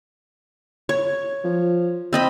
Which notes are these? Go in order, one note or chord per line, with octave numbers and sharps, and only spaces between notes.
C#5
F3
C4 D#5 B5